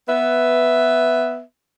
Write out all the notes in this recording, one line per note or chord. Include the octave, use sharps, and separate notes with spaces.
B3 B4 E5